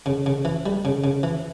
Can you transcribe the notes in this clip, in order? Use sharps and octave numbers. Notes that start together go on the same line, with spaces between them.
C#3
C#3
E3
G3
C#3
C#3
E3